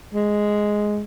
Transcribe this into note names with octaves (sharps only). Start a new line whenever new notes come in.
G#3